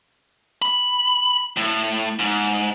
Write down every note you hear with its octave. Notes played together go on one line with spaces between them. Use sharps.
B5
A2
G#2